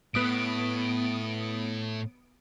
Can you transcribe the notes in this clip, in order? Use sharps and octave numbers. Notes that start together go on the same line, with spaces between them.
A2 B3 D#6 D7